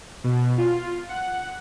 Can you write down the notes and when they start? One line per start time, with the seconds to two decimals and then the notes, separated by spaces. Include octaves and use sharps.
0.24 B2
0.58 F4
1.09 F#5